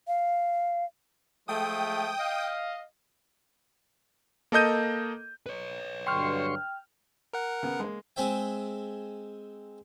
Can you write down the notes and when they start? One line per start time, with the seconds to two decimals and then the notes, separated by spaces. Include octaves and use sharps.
0.08 F5
1.48 F3 G#3 A3 G5 D#6
2.18 D#5 F5
4.52 A#3 A4 D#5 G6 D#7
5.46 B4 C#5
6.07 G2 D3 F#3 G5 C6 C#6 F6
7.33 A#4 F#5
7.63 C#3 B3
7.80 G#3 A#3
8.16 G#3 C4 G#4 C5 E5 G5